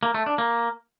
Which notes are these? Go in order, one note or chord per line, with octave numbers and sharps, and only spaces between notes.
A#3
A3
D4
A#3